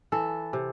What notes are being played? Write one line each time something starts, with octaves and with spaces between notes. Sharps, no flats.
E3 A4
C3